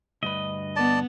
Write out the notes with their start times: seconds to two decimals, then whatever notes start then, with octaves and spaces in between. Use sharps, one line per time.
0.23 D2 G2 B4 D#5
0.76 B3 D5 A5